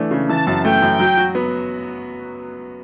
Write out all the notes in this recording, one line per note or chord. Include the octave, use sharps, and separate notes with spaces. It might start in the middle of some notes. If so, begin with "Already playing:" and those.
Already playing: E3 A3 D4
C#3
E3 A5
F#2
A3 G5
F#2
F#3
F#4
B3